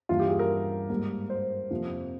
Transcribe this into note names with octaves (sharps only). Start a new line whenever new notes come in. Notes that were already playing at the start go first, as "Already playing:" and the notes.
G2 E3 G3 A#3 F4
G4
G#4
A#4
G#2 G3 A#3
C5
F2 C3 F3 A#3